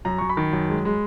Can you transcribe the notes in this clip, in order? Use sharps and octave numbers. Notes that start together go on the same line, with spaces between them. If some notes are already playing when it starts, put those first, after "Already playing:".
F#2 A#5
F#2 C#6
B5
D#3
F#2
G#3
G#3